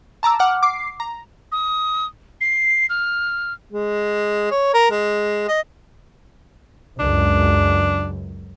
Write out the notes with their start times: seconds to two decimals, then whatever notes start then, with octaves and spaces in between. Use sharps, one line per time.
0.23 A5 A#5 D6 E6
0.39 F#5 D6 F6
0.63 D6 C7
1.00 A#5
1.52 D#6
2.41 C7
2.89 F6
3.72 G#3
4.51 C#5
4.74 A#4
4.91 G#3
5.48 D#5
6.99 C#2 F#2 D4